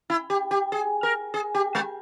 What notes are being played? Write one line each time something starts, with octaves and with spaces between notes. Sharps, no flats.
E4
G4
G4
G#4
A#4
G#4
G4
G#3